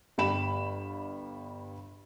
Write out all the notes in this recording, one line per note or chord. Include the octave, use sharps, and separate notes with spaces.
G1 G3 B5 E7